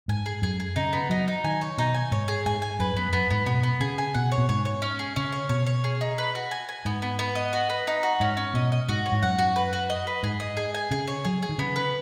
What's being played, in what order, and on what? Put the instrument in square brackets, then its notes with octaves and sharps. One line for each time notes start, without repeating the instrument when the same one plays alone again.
[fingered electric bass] G#2 [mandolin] G#5
[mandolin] G#4
[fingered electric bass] F#2 [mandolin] G#4
[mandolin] G#4
[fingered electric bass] C#3 [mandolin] D#4
[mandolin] B3
[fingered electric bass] F#3 [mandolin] D#4
[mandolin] D#4
[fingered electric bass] D#3 [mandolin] G#5
[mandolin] C#5
[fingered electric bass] B2 [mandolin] D#4
[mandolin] G#5
[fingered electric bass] G#2 [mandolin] C#5
[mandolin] G#4
[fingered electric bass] G#2 [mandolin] G#5
[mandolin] G#5
[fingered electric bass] F#2 [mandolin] B4
[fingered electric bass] F#2 [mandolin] B3
[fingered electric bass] F#2 [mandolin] B3
[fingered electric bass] G#2 [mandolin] B3
[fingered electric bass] B2 [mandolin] B3
[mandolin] B3
[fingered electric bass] C#3 [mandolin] G#4
[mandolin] G#5
[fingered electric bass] B2 [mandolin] F#5
[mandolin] C#5
[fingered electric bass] B2
[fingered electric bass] G#2 [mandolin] C#5
[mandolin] C#5
C#4
G#4
[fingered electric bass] C#3 [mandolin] C#4
[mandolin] C#5
[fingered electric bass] B2 [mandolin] C#5
[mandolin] C#5
G#4
D#4
B4
F#4
G#5
G#5
[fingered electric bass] G#2 [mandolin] B3
[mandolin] B3
B3
D#5
F#4
B4
D#4
F#4
[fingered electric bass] G#2 [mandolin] C#4
[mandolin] C#4
[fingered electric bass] B2 [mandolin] D#5
[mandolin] D#5
[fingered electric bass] G#2 [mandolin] F#4
[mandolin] C#5
[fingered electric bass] G#2
[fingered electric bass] F#2 [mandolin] F#5
[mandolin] F#4
B4
F#4
D#5
B4
[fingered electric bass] G#2 [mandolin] G#4
[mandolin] D#5
G#4
G#5
[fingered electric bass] C#3 [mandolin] G#4
[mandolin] C#5
[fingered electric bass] F#3 [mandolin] G#4
[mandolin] G#4
[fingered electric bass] D#3
[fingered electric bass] C#3 [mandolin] B3
[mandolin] B4